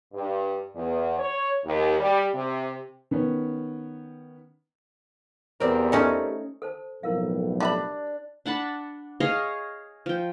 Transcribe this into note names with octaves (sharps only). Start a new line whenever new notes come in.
G2
E2
C#5
D#2
G3
C3
D#3 B3 C#4
E2 G3 C4 A#4
A3 C#4 D#4
A4 C5 A5
B1 F2 A2 E4 A#4 F5
G3 D4 E5 B5
D4 F#5 A5 B5
G#4 C#5 D#5 F5
F3 G5